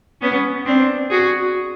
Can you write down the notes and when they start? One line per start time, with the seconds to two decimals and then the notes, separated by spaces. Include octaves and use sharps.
0.21 B3 C#4
0.66 C4 D4
1.10 F#4 G#4